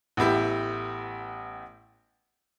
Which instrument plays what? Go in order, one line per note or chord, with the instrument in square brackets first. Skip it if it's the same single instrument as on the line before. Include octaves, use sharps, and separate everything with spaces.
[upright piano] A1 B3 E4 G4